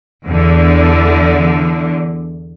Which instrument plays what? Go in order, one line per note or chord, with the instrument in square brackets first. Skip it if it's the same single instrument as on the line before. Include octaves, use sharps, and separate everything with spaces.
[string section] E2 D3